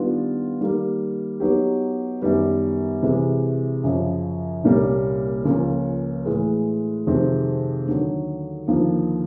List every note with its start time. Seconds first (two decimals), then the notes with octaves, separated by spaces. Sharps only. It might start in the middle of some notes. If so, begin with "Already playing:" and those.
Already playing: D#3 G3 B3 D4 F4
0.60 D#3 G3 A#3
1.40 F#3 B3 D#4 G4
2.22 F#2 D#3 G3 B3
3.03 C3 E3 G#3
3.84 F#2 C#3 F3
4.64 C2 A#2 G3 A#3 C#4
5.45 C#2 C#3 F3 A#3 C#4
6.25 A2 E3 G#3
7.07 F2 C3 D#3 G#3 C4
7.87 D#2 D3 F#3
8.68 D#2 D3 F3 A#3